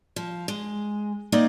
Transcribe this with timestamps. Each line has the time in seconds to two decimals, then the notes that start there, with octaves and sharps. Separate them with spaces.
0.16 F3
0.48 G#3
1.32 A#3 C4 D#4 D5 D#5